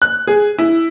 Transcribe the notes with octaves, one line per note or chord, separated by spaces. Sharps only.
F#6
G#4
E4